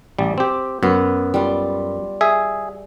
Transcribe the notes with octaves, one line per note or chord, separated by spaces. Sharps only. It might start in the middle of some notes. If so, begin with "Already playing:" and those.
A1 G3
C4 G4
F#2 B3
G3 F4
G#4 E5